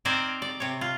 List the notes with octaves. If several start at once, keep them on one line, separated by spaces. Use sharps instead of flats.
C4 D#4 A#4 C5 D5 G#5
D5
C3 C#5
F4